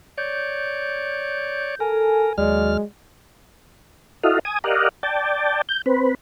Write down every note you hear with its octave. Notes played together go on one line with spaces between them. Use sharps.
C#5 D5 G6
A4 A#4 G#5
D#2 F#3 G#3 D5 F6
E4 F#4 A4 D#5 F5
G#5 D#6
G4 A#4 D5 D#5 F5 F#5
D5 G5 A5
G6
C4 B4